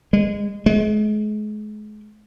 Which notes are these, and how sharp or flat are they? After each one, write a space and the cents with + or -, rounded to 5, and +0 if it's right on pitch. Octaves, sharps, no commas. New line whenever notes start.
G#3 -25
G#3 +35